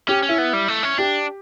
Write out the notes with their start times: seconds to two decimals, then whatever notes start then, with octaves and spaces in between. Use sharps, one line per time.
0.08 C#4 G4
0.23 C#4
0.29 E4
0.38 B3
0.53 G3
0.68 A3
0.83 C#4
0.98 D4 G4